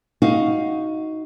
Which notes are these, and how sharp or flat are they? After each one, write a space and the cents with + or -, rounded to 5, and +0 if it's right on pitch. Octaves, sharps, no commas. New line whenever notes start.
D#4 +15 F#4 +0 F5 +0